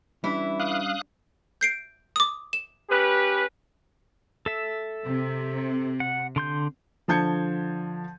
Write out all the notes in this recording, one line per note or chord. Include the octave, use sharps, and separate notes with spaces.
E3 G3 C#4 D4 E4
F5 D#6 F#6
G6 C7 D7
D6 D#6
E7
C#4 G4 B4
A4 E5
C3
F#5
D3 C6 G6
D3 F3 A5 G6 G#6 C#7